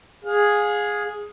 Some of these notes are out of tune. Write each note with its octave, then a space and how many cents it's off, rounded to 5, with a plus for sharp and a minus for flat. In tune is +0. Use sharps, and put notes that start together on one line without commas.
G#4 +0 F5 +35